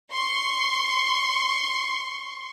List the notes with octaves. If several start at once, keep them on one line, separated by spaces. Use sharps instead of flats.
C6 C#6